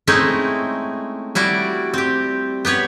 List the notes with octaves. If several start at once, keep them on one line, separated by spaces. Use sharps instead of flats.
G#3 A3 C4 C#4 D#4 E4
G3 E4 F#4 D5
C4 G4
B3 G4 B4 C#5